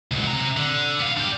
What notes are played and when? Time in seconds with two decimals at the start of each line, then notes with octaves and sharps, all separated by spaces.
0.11 C#2 F#3
0.27 C3 A#5
0.57 D3
0.99 B3 F5
1.17 D4 G4